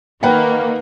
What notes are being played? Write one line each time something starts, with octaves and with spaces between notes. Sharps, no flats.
D#3 A#3 B4 F#5 G5